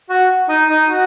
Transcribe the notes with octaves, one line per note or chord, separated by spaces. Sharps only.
F#4
D#4
D#4
F#4